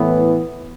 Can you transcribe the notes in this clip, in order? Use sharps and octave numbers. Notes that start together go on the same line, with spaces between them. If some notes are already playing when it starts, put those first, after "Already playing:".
Already playing: A2 E3 B3